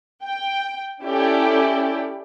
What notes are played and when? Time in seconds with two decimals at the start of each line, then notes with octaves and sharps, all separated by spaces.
0.22 G5
1.03 C#4 E4 G4 A4 D5